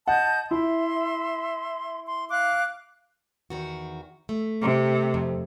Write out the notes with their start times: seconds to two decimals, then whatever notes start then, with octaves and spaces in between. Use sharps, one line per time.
0.08 D#5 F#5 A5 G6
0.51 E4 E5 C6
2.07 C6
2.30 F5 D6 F#6
3.50 E2 D#3 F#4
4.29 A3
4.62 C3
5.14 F2